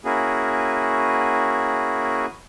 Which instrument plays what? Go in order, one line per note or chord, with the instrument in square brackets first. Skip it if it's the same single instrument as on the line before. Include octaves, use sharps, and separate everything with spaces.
[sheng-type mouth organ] A#3 C#4 E4 F#4 G#4